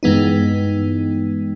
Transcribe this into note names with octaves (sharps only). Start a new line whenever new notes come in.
G2 E3 G#3 B3 D#4